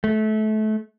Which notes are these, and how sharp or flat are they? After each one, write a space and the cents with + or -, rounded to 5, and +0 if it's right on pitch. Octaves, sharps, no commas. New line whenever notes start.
A3 -25